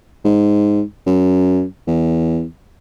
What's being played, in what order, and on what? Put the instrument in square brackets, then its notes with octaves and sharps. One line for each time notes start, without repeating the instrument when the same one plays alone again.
[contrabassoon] G#2
F#2
E2